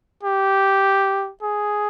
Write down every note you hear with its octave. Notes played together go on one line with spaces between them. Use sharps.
G4
G#4